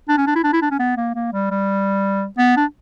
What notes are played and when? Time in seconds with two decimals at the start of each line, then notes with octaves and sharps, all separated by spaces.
0.09 D4
0.17 C#4
0.27 D4
0.35 E4
0.44 D4
0.53 E4
0.62 D4
0.71 C#4
0.79 B3
0.97 A#3
1.15 A#3
1.33 G3
1.51 G3
2.38 B3
2.57 D4